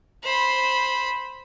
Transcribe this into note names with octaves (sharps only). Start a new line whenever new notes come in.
C5 B5